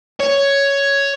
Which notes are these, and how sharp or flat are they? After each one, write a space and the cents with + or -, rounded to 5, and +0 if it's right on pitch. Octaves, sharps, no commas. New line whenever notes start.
C#5 +5